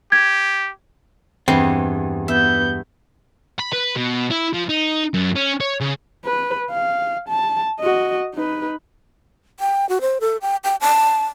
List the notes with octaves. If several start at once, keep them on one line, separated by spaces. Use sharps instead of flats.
G4 G#6
E2 G2 C4 D#5
B3 E5 G6
B5
B4
B2
E4
F3
D#4
F#2
C#4
C#5
C#3
B4
F5
A5
F#4 D#5
D#4 B4
G5
F#4
C5
A4
G5
G5
A5